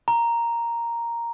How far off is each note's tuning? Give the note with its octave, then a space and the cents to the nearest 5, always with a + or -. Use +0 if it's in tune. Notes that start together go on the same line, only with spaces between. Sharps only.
A#5 +0